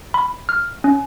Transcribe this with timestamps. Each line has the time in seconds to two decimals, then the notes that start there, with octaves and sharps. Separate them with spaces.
0.14 B5
0.49 F6
0.84 C#4